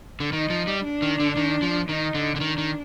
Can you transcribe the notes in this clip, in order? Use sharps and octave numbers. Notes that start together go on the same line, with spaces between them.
D3
D#3 D#4
F3
G3
D4
D#3
D3
D#3
F3
D#3 D#4
D3
D3
D#3 D4
D#3